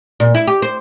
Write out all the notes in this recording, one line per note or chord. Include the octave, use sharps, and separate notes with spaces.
A#2
E4
G4
C5